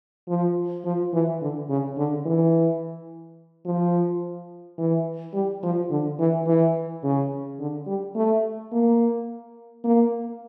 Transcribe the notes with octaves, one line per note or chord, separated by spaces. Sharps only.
F3
F3
E3
D3
C#3
D3
E3
F3
E3
G3
F3
D3
E3
E3
C#3
D3
G3
A3
A#3
A#3